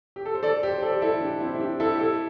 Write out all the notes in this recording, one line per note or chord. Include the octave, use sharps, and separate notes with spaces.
G4
A4
C5
A4 D5
G4 C5
C5
A4 D5
G4
E4 A4
D4 G4
C4 E4
E4
D4 G4
E4 A4
G4
E4 A4